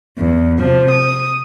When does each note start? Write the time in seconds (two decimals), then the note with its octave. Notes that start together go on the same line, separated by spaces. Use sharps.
0.18 E2
0.58 C3 F3
0.91 D#6